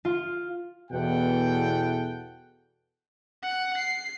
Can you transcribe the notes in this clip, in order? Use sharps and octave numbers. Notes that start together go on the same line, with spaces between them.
F4
E2 B2 E3 A4 F#5 G5
F#5 F#6
C7